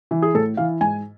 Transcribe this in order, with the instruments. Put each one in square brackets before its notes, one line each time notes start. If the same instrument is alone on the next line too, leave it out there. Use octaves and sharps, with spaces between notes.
[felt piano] E3
G#4
A2 A4
E3 F5
G#2 G#5